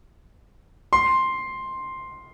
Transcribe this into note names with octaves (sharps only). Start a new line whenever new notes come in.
C6